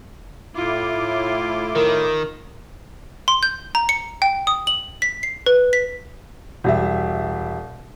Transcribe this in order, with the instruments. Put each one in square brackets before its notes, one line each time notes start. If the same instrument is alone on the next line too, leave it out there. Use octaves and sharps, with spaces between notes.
[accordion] A2 E4 D6 [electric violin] F4
[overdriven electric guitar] D#3 [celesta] A#4
[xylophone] C6
G6
A#5
C#7
G5
D#6
F#7
B6
C7
B4
B6
[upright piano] E1 G3 E5